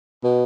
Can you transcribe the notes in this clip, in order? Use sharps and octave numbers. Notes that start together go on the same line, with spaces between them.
B2